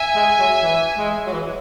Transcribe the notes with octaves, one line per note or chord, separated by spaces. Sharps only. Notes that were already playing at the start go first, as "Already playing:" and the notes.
Already playing: E5 G#5
G#3
F#3
E3
G#3
F#3
E3